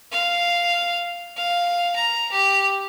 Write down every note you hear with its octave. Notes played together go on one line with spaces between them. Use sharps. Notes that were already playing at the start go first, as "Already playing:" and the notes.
F5
F5
A#5
G4